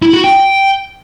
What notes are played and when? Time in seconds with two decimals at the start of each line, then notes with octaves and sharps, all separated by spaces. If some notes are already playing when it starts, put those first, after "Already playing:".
0.02 E4
0.13 F#4
0.24 G5